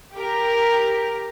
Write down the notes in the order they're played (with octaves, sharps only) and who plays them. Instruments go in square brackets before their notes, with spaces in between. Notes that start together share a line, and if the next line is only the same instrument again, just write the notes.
[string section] G4 A#4